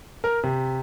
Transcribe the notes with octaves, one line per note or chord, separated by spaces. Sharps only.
A#4
C3